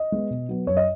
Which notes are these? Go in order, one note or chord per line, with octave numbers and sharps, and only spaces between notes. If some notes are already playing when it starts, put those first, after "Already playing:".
Already playing: D#5
G#3 B3
B2
F#3 B3
F#2 C#5
D#5